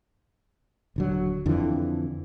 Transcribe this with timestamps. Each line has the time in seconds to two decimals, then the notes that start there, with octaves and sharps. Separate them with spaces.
0.96 D#1 D3 F#3
1.46 F2 D3 E3